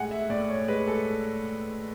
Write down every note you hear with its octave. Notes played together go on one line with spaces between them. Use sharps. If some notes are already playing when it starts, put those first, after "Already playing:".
Already playing: A2 G#3 F#5 G#5
E5
A2 D5
C#5
G#3 B4
A4